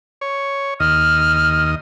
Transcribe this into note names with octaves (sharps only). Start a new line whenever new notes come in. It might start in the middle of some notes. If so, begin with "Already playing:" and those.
C#5
D#2 D#5 F6